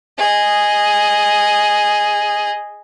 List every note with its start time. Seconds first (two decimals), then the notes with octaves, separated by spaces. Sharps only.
0.18 G#4 D#5